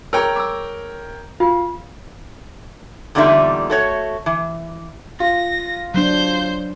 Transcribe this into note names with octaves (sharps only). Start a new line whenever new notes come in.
G#4 A#4 C#5 G5 C#6 E6
D6 E6
F4 F5
E2 A#2 D3 G3 D#4 E5
A3 F#4 C#5
E3
F4 A#6
F#3 D4 C5 G6